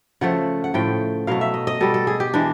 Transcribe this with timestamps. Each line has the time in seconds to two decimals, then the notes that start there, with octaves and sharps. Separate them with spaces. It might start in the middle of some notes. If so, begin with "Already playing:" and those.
0.21 C#3 F3 A3 F#5
0.64 F#5
0.74 A2 F3 A3 G5
1.27 B2 F#3 A3 F5
1.41 E5
1.54 D#5
1.67 D#5
1.81 B2 G3 A4
1.94 A4
2.07 G#4
2.20 G4
2.34 E3 G#3 D4